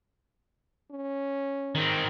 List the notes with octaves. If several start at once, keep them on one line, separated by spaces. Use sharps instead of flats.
C#4
D#3 C4